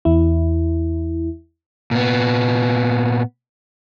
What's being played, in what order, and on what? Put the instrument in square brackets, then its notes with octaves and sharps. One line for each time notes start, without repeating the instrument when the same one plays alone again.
[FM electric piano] E2 E4
[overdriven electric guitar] A#2 B3